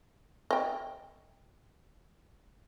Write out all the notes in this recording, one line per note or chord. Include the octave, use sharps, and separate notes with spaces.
D#5 G5